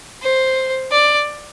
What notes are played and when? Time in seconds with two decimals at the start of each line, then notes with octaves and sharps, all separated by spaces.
0.22 C5
0.92 D5